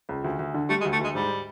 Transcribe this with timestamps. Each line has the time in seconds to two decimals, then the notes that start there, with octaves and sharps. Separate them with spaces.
0.09 C#2
0.24 D2
0.39 D2
0.54 D3
0.69 G3 A3
0.81 G#3
0.85 D2
0.93 A3
1.00 D2 G#3
1.15 G#2 G3